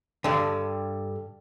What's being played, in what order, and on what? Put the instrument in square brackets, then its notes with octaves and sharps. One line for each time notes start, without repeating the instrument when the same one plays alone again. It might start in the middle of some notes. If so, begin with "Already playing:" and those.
[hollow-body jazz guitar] G2 D3